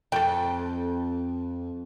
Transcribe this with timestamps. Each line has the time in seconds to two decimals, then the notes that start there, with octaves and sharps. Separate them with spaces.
0.12 F2 A4 G5